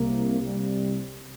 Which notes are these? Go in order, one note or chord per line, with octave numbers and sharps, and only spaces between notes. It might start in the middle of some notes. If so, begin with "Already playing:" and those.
Already playing: C2 C3 A#3
C2 C3 G3